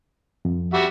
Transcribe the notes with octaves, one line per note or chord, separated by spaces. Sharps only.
F2
G3 F#4 E5